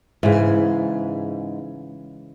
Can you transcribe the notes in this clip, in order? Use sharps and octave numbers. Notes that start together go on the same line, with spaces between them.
G#2 C#3 E3